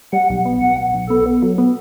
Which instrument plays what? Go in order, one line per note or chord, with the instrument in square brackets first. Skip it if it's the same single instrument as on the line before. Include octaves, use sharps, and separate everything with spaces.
[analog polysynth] G3 [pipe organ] F#5
[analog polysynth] B1
B3
[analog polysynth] B1 [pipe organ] F#5
[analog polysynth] B1
B1
[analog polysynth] B3 [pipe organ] A4
[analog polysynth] B3
F#3
B3